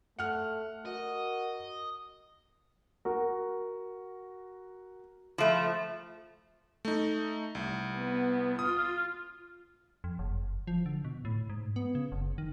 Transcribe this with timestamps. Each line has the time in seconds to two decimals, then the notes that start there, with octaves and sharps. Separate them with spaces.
0.19 A3 F#5 F6
0.85 F#4 A#4 D#5
3.05 F#4 A#4
5.38 F3 A3
6.85 A3 D#4
7.55 C2
7.96 B3
8.59 F4 D#6
10.04 F2
10.19 F#1
10.67 F3
10.86 D3
11.05 B2
11.25 A2
11.50 G#2
11.76 B3
11.95 C#3
12.12 F#1
12.38 D#3